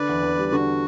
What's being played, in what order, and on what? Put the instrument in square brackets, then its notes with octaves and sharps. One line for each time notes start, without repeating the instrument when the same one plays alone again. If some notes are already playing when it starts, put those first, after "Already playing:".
Already playing: [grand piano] D3 [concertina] B4 D5
[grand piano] E2
E2
G3
[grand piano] D3 [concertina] F#4